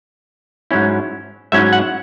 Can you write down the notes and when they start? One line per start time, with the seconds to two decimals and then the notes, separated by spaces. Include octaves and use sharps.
0.71 G#2 F#3 C#4 E4
1.52 G#2 F#3 C#4 E4 E5
1.73 F#5